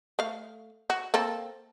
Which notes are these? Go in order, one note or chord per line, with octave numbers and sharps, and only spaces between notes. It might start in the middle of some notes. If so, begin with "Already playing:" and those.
A3 F5
F#4
A#3 C4 A4